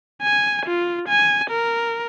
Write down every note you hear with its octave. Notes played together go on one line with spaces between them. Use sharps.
G#5
F4
G#5
A#4